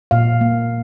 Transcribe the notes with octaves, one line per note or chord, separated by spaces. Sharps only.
A#2 F5
A#3